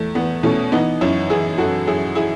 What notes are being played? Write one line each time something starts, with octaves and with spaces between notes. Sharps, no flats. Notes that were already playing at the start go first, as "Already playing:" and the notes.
Already playing: E2 A3
E2 B3
B2 A3 C#4
E3 B3 D#4
F#2 C#4 E4
E3 E4 G#4
F#2 F#4 A4
F#2 E4 G#4
E4 G#4